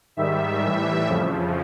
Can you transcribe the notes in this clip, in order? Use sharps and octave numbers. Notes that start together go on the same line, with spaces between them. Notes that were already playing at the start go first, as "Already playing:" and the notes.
G#2 D#3 G3 E5
A2 E3 G3
F2 C#3 F3